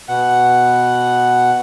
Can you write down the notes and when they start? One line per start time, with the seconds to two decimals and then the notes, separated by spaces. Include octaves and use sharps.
0.09 B2 F#5